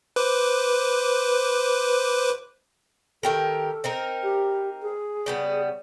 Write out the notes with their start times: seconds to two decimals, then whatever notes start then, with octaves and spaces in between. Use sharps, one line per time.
0.16 B4 C5 D6
3.23 D#3 G4 A4 A#4
3.84 C4 D#4 A#4
4.23 G4
4.82 G#4
5.26 C#3 G3 B3